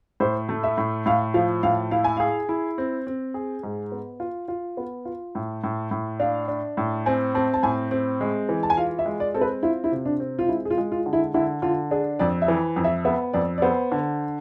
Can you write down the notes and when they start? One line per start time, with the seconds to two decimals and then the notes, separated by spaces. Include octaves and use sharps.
0.20 A2 C5
0.49 A3
0.63 E5
0.77 A2
1.06 A2 F5
1.34 F3 F5
1.63 A2 F5
1.91 E4 F5
2.04 G#5
2.17 G#4 F5
2.49 E4
2.78 C4
3.07 C4
3.34 G#4
3.63 G#2
3.92 B3
4.20 F4
4.48 F4
4.77 B3
5.05 F4
5.35 A2
5.64 A2
5.91 A2
6.20 D4 F5
6.48 D4
6.77 A2
7.06 C4 G#5
7.35 C4 A5
7.54 A5
7.63 A2 G#5
7.91 C4
8.21 G#3
8.49 E3
8.63 A5
8.70 G#5
8.77 F4 F5
8.99 E5
9.06 G#3
9.20 D5
9.34 C4 A4
9.41 B4
9.63 E4 F4
9.84 E4
9.92 C3
10.06 D4
10.20 C4
10.39 F4
10.49 G#3 E4
10.65 G#4
10.71 F4
10.78 G#3
10.92 F4
11.06 D3
11.13 E4
11.34 D3 E4
11.62 D3 F4
11.91 D4 G#4
12.19 F2 D5
12.42 E5
12.48 E3
12.76 F2
12.84 E5
13.05 B3 E5
13.33 F2 D5
13.58 D5
13.62 B3 C5
13.92 D3